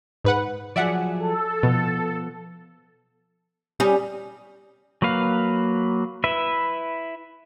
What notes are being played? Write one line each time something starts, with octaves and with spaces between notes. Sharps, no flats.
G#2 B4 F#5
F3 F#3 G#4 D5 E5 F#5
A4
B2 F3 B3
G3 C#4 G4 D#6
F#3 A#3 B4 F5
E4 B4 E5